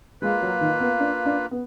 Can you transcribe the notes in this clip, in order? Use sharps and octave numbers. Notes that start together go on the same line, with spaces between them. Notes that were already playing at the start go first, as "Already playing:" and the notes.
G#3 A#3 F4 B4
F#3
D#3
B3
D4
D4
B3